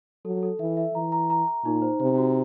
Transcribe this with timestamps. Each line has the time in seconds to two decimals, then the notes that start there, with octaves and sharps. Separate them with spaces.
0.25 F#3 A4
0.43 A4
0.60 E3 E5
0.77 E5
0.94 E3 A#5
1.12 A#5
1.30 A#5
1.47 A#5
1.65 A#2 D#4
1.82 C5
2.00 C3 C5
2.18 F#4